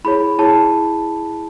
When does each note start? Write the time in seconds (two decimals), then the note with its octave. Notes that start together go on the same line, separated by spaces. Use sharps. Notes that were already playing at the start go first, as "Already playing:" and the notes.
0.04 E4 G#4 C#5 B5
0.38 E4 G#4 C#5 A5